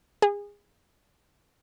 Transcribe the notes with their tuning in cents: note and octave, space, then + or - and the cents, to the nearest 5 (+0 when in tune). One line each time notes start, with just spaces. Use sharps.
G#4 -25